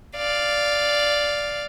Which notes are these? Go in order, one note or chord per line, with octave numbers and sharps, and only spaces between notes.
D5 F5